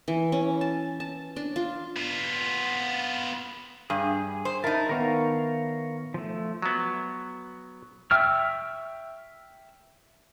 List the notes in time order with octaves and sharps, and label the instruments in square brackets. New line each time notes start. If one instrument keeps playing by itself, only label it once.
[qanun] E3
C#4
A5
A5
D4
F4
[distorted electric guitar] B3 F4
[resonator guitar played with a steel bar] G2 [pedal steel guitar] G#4
[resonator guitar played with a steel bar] C5
[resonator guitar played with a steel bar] D#4 E4 [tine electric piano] A#4 [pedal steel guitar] A5
[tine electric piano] D#3 B3 [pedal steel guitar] A#4 C#5 F5
[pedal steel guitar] F3 A3
[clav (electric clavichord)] F#3 B3
[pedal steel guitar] E5 G5 C#6 E6 F6